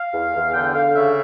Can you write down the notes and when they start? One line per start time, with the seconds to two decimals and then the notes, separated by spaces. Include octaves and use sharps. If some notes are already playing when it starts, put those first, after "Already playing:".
Already playing: F5
0.13 E2
0.34 E2
0.54 D3 G5
0.75 D3 F5
0.95 C#3 E5